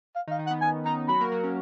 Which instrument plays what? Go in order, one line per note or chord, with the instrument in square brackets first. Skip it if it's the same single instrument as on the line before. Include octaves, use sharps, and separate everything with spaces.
[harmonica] F5
[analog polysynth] D#3 D#4
[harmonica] F5
[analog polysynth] D#3 D#4
[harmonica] F#5
[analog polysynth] B3
[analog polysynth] C#4 [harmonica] G#5
[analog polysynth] D#3 D#4 [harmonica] A#5
[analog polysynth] F#3 F#4 [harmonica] B5
[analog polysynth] A#3 A#4
F#3 F#4
C#4